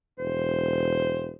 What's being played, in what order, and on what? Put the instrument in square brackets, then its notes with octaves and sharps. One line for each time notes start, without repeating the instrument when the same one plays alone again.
[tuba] E1 [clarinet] C5